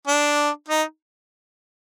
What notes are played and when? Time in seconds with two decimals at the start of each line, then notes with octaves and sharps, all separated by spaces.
0.07 D4
0.69 D#4